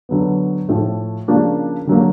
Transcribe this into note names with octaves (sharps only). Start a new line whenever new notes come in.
D3 F#3 B3
A2 F3 A3
C#3 F3 A#3 D4
D3 F#3 A#3